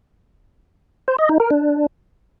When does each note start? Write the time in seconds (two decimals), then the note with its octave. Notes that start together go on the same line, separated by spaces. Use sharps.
1.08 C5
1.19 D#5
1.29 D#4
1.40 A#4
1.51 D4